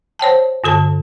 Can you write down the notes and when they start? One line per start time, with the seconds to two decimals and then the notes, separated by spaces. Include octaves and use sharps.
0.19 C5 C#5 G5 A5
0.64 G2 D3 A4 A5